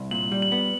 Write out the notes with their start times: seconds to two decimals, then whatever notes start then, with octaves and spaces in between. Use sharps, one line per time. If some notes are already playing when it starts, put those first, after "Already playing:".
Already playing: C2
0.11 A#2 F#7
0.31 G3
0.42 F#7
0.52 B3